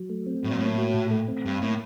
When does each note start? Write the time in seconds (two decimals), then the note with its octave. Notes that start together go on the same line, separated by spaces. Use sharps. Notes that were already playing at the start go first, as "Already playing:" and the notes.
Already playing: F#3
0.09 A3
0.26 C4
0.44 A2 F#3
0.51 A#2
0.58 A2 A#3
0.78 F#4
0.94 A#2
1.11 A3
1.28 C4
1.45 G2 G3
1.61 A2 A#3